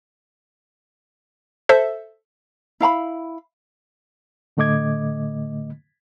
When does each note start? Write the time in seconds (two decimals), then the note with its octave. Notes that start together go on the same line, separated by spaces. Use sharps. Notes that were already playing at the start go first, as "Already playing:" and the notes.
1.69 A4 C5 E5
2.80 E4 F5 A#5 B5
4.57 A2 D3 A3 D#5 D6 G#6